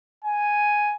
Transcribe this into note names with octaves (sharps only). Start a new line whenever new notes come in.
G#5